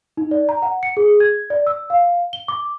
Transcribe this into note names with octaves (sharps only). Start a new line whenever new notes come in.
D#4
D5
A#5
F#5
C#7
G#4
G#6
D5
E6
F5
G7
D6